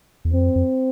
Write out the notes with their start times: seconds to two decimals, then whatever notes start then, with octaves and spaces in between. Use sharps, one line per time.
0.25 E2
0.33 F2 C4
0.56 F2